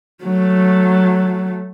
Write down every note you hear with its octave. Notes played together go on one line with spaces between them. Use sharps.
F#3 A3